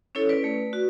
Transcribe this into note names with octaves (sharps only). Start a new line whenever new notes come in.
C#4 E4 A4 C#5
B4 D5
A3
F#4